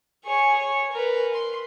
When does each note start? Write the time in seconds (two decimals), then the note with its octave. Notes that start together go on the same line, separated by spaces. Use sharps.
0.25 G#4 C#5
0.59 C#5
0.92 A#4 B4
1.34 C6